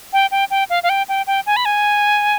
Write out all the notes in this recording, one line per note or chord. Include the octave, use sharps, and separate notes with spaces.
G5
G5
G5
F5
F5
G5
G5
G5
G#5
B5
G#5